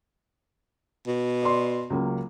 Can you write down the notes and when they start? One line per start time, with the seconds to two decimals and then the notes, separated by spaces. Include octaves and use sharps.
1.07 B2
1.43 D5 C6
1.90 C#2 F#3 A#3